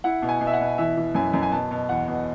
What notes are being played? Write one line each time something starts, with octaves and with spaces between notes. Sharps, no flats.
E4 F#5
B2
G#5
B2
E5
F#5
B2
E3 E5
E3
F#2 G#5
F#2
G#5
B2 A5
B2
E2 F#5
B2